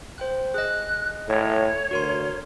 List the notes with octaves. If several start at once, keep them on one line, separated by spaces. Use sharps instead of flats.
C5 G5 F#6
G#4 D#5 F#6
A2 C#5
D2 F#4 A#4 C6